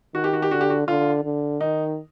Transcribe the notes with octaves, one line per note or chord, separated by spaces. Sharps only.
D#3 F#4
G4
F#4
G4
D3 F#4
G4
F#4
D3 F4
D3
D#3 D#4